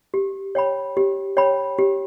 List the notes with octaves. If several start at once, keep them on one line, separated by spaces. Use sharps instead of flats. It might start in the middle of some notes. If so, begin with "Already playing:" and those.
G4
C#5 G5 B5
G4
C#5 G5 B5
G4